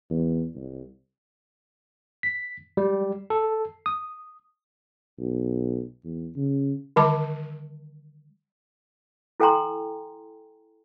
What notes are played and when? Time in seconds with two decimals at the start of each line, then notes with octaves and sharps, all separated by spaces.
0.10 E2
0.55 C2
2.23 B6
2.77 G3
3.30 A4
3.86 D#6
5.18 B1
6.04 E2
6.36 C#3
6.96 D3 D#3 G3 A5 D6
9.40 E4 A4 G5 G#5 A#5 C6